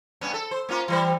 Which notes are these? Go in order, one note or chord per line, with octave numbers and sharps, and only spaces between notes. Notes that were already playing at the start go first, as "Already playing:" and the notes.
G2 B3 C#4
A4
C5
A#3 C#4 F4
E3 G3 C5